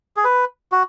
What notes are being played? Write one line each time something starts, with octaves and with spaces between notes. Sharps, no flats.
G#4
B4
F#4